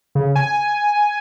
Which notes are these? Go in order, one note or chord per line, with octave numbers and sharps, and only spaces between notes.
C#3
G#5